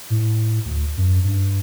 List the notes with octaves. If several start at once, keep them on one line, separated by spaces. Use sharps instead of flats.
A2
D2
F#2
G2